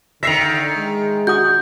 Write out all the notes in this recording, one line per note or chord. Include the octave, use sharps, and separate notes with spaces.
D3 D#3 E5 A#6 C7 F7
G#3
F#4 F#5 D#6 G6